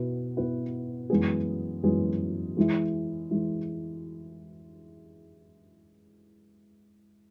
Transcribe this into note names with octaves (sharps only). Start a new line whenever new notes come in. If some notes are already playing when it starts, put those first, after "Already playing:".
Already playing: B2 B3 E4 B4
B2 B3 E4 B4
F#2 E3 G#3 B3 G#4
F#2 E3 G#3 B3 G#4
E3 G#3 E4
E3 G#3 E4